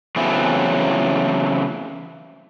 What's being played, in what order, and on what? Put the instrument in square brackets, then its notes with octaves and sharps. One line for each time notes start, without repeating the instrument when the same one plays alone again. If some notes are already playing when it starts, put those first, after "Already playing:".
[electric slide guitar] C#3 E3 F#3 A3 B3 C4